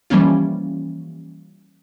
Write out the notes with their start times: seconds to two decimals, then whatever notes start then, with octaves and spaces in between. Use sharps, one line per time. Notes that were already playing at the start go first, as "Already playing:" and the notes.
0.10 E3 F3 G3 A#3 C#4 F4